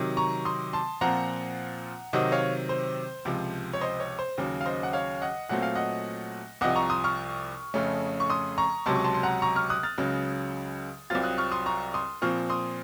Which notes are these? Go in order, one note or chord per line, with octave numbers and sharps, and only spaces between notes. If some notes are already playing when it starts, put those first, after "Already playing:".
Already playing: C3 D#3 F#3
A#5 C#6
C6 D#6
A5 C6
A#2 F3 C4 F4 F#5 A#5
C3 D#3 F#3 C4 D#5 F#5
C#5 F5
C5
C#2 C3 F3
C#5
C5 D#5
C#5
C5
D#2 C#3 F#3
F5
C5 D#5
F#5
C#5 F5
D#5 F#5
A#2 F#3 A3 C4 F#5
F5
D#5 F#5
C2 C3 F3 D#5 F#5
A#5 C#6
C6 D#6
C#6 F6
F2 C#3 A3 C#4
C#6
C6 D#6
A#5 C#6
C#2 C3 F#3 A5 C6
C#6
A5 C6
C6
F#5 A#5
A#5 C#6
C#6 F6
D#6 F#6
F6 A6
C#2 C#3 F#3
C2 C3 F#3 C4 F4 F6 A6
D#6 F#6
C#6 F6
C6 D#6
A#5 C#6
C6 D#6
A#2 F3 C4 F4 C#6 F6
C6 D#6